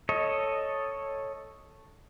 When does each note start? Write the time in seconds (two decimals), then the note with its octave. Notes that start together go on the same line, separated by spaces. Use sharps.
0.09 A4 C#5 D#5